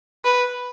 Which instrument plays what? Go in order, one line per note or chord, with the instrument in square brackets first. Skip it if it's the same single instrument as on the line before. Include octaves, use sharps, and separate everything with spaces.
[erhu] B4